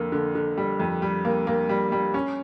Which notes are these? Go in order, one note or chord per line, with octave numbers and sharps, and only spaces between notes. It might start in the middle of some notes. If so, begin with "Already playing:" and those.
Already playing: F2 D3 A#3
D3
D3
G3
F2
G3
A#3
A#3
G3
G3
C#4